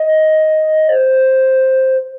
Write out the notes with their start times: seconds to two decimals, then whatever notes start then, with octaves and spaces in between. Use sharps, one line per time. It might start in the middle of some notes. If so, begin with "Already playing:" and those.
Already playing: D#5
0.89 C5